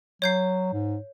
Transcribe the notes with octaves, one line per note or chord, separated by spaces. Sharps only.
F#3 C#5 G6 C7
G#2